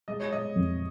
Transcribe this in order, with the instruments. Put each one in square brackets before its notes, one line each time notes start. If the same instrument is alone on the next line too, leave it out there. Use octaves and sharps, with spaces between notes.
[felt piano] G#3 [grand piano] D#5
[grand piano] C#5
[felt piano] G#3 [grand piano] D#5
[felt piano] F2